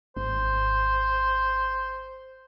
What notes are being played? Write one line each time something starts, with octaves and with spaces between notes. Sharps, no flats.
G#1 C5